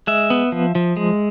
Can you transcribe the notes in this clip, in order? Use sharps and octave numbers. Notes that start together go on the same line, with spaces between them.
G#3 E5
B3
F3
F3
G#3